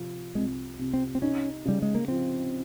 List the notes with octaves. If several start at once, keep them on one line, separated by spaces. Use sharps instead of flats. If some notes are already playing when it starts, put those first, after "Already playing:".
Already playing: C3 F3
C2 G#3
C3
C4
C4
C#4 D#4
C#3 G3
G#3
A#3
F3 C4